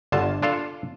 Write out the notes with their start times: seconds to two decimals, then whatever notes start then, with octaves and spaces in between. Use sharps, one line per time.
0.12 G1 D3 F4 A5
0.42 D4 F4 A4 F5